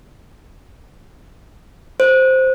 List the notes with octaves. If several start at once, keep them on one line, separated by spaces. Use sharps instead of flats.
C5